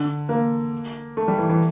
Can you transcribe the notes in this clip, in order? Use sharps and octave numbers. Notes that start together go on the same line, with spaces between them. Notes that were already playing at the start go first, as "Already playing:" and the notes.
Already playing: D3
A#3
A3
G3
E3
E3